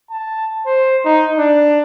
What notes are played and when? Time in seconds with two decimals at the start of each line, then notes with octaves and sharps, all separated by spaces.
0.11 A5
0.66 C5
1.05 D#4
1.39 D4